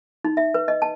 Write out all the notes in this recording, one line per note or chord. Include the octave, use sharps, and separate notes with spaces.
D#4
E5
B4
D#5
A5